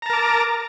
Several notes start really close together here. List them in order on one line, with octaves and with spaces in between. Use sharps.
A#5 A5 A#4 D6